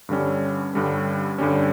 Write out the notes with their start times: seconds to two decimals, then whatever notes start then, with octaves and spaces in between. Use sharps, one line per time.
0.09 G2 D3 G3 C#4
0.74 G2 D3 G3 C#4
1.38 G2 D3 G3 C#4